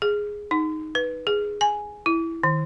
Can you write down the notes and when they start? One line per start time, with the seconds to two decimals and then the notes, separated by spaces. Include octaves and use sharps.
0.02 G#4
0.51 D#4
0.95 B4
1.27 G#4
1.61 G#5
2.06 E4
2.43 D#3